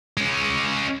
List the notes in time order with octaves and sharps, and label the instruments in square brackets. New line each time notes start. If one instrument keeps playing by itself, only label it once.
[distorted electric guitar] G#3 C#4